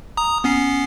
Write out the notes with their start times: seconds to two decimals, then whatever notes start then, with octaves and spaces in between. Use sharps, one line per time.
0.17 A#5 D#6
0.44 B3 C#4 C7